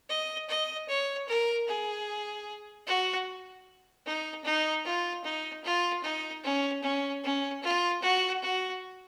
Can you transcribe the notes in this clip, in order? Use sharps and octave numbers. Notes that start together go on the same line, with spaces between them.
D#5
D#5
C#5
A#4
G#4
F#4
D#4
D#4
F4
D#4
F4
D#4
C#4
C#4
C#4
F4
F#4
F#4